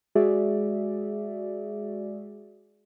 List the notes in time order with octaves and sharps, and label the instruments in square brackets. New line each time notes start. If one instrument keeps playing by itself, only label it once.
[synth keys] G#3 F#4 G#4 D5 E5